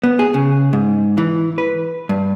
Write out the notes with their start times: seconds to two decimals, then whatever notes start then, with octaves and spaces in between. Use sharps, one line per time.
0.04 B3
0.19 G#4
0.34 C#3
0.73 G#2
1.18 E3
1.58 B4
2.09 G2